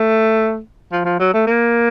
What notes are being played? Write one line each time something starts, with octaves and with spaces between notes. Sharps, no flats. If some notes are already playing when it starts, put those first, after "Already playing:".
Already playing: A3
F3
F3
F#3
A3
A#3